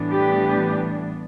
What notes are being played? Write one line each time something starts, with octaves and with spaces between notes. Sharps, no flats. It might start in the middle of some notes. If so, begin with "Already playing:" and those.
Already playing: A2 E3 G3 B3 D4
G4 B4